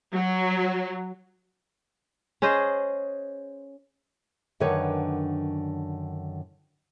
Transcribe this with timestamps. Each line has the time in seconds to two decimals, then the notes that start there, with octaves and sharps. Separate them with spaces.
0.14 F#3
2.42 C#4 G#4 C5 D#5
4.60 F#2 D3 D#3 D4 B4 C#5